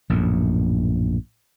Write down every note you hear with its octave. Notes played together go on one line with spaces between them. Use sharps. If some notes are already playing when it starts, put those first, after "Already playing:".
A#1 F#2 A2